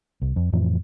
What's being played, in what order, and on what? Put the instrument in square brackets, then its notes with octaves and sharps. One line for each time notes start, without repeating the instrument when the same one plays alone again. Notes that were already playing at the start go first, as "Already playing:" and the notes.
[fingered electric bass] C2
F2
F2 A2 E3 F3